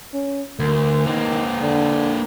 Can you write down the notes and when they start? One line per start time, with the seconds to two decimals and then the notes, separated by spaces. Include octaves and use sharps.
0.13 C#4
0.59 D2 A#4
1.06 D#3 A#3 C4
1.62 D3